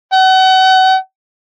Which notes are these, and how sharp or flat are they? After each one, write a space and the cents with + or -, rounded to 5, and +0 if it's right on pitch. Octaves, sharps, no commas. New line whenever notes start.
F#5 +35